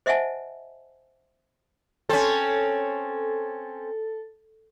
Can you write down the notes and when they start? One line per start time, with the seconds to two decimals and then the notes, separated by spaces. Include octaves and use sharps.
0.06 C5 D#5 E5 F#5 G#5 A5
2.09 C4 C#4 A4